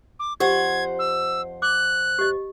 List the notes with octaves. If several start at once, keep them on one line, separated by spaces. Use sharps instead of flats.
D6
F2 G4 C5 D#5 F#5 G#6
E6
D6 F#6
G4 D#5